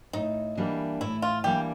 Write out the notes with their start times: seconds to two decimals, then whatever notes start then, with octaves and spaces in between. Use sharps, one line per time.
0.13 A2 D#4
0.57 E3 G3 A#3 D4
1.01 A2 E4
1.22 F4
1.44 E3 G3 A#3 D4 G4